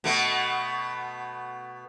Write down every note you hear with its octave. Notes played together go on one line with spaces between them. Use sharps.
B2 A3 B3